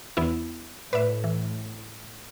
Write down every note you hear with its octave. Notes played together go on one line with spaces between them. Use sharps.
E2 B3 E4
A2 B4 D5 E5
E3